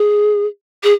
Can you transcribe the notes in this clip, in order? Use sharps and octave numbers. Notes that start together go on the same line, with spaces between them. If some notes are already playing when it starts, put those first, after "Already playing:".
Already playing: G#4
G#4